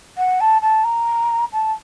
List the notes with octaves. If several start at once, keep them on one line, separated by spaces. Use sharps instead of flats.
F#5
A5
A5
A#5
A5